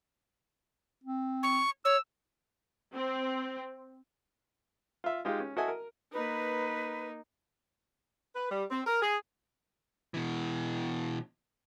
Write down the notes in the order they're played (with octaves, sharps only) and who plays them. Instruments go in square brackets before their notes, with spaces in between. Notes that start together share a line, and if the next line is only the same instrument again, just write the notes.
[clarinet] C4
[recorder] C#6
[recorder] C#5 [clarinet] E6
[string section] C4
[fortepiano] F4 E5
G#3 D#4 F4 G4
C#4
E4 F#4 A4 D#5 E5 G#5
A#4
[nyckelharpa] A#3 D#4 [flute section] B4
[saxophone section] B4
G3
C4
A#4
G#4
[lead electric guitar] B2 E3